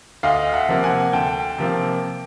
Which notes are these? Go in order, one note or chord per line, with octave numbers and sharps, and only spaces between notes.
D2 D#5 F5
E5 F#5
C3 F3 A#3
F#5 G#5
D2 G5 A5
C3 F3 A#3